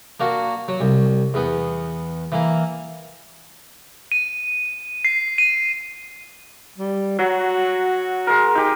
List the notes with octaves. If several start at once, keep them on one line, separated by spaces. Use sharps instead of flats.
A#3 D4 F#4
F#3
C2
E2 B3
E3 A#3
D#7
C7
D#7
G3
F#3 F#4
G#3 A#4
D#4 G4